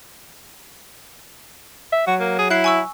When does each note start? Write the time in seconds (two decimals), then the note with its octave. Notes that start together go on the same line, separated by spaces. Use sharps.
1.92 E5
2.07 F#3 F#4
2.20 A#3
2.39 G#4
2.50 E4 F#6 C7
2.64 G#5 C#6 E6